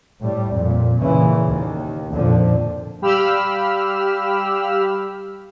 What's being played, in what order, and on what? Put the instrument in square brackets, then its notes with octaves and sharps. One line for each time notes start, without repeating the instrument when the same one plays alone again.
[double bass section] A2 G3
F2 A#2
A#2 C#3 E3
D#2
F2 A#2 D3 F3
[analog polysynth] G3 G4 F5 B5 E6 F6